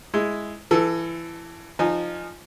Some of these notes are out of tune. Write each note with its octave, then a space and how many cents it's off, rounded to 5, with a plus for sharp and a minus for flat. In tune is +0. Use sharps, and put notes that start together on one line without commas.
G#3 +0 E4 +0
E3 +25 A4 +0
F3 +0 D#4 -25 G#5 +0